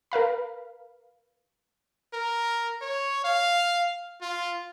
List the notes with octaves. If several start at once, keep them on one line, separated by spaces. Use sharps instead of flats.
A#4 B4 F5 B5
A#4
C#5
F5
F4